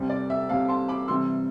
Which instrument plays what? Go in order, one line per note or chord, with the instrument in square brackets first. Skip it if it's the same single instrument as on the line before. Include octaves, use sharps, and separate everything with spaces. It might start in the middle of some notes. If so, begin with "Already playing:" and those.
Already playing: [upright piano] C2 C3 G3 C4
D5
E5
C2 C3 G3 C4 F5 A5
A5 C6
B5 D6
C3 E3 G3 C6 E6